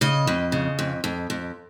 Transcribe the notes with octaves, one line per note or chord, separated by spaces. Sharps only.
C#3 D#5
F2
C#3
F2
F2
F2